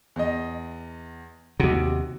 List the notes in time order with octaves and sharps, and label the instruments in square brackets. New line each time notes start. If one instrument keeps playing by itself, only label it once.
[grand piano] E2 D#5
[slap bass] D#2 C3 [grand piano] F#4